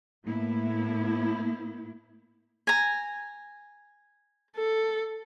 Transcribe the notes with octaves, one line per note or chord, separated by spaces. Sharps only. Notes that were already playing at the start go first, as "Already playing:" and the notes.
A2 A#3 B3 E4
G#5 A#5
A4